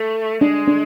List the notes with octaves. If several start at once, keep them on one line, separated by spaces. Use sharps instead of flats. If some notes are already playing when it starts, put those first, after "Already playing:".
Already playing: A3
G#3 D4
D4